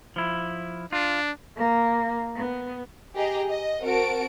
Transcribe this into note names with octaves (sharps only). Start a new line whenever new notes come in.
F3 E4
D4 F4
A#3
B3
G4 G#4 D#5 A#5
D#5
C4 F#4 A#4 A5 D7